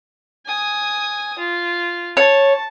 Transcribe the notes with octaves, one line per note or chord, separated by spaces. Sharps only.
G#5 D#6
F4
C#5 A5